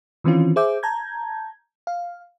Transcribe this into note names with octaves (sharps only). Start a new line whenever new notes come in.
D#3 E3 C4 C#4 F4
G#4 C5 E5 D6 G6
A5 A#5 G6 G#6
F5